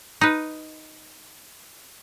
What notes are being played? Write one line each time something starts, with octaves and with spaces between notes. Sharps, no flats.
D#4 B4